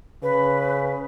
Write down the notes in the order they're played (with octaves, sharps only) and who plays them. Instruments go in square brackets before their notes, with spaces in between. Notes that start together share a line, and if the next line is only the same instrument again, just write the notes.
[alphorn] C#3 [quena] B4